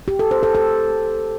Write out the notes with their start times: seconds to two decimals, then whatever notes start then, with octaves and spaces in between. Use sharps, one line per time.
0.08 G4
0.19 A4
0.31 C5
0.43 A4
0.55 A4